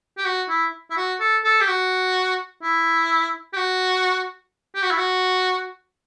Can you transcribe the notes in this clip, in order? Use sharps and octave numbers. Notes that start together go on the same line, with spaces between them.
G4
F#4
E4
E4
F#4
A4
A4
G4
F#4
E4
G4
F#4
G4
F#4
E4
F#4